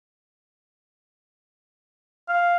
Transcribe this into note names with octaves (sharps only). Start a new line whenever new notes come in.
F5